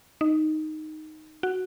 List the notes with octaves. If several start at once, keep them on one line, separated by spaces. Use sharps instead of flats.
D#4
F#4